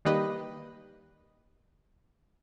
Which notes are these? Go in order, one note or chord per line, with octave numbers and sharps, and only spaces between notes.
D#3 G3 A#3 G4 B4 D#5